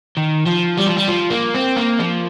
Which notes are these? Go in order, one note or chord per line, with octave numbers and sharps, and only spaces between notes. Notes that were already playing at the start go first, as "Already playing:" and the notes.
D#3
F3
G3
F3
G3
F3
A#3
C4
A#3
F3